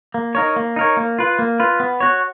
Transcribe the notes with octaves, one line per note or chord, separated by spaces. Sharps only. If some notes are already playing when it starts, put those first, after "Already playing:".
A#3
D#4 A#4 C#5
A#3
D#4 A#4 C#5
A#3
F4 B4
A#3
F4 B4
B3
F#4 C#5